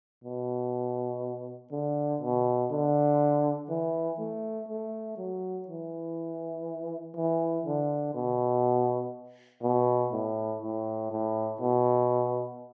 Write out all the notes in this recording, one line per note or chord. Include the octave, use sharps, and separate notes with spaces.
B2
D3
B2
D3
E3
A3
A3
F#3
E3
E3
D3
B2
B2
A2
A2
A2
B2